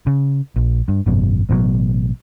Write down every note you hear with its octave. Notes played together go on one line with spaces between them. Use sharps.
C#3
A#1
G2
G#1 F#2 B2
A1 B2 E3 F#3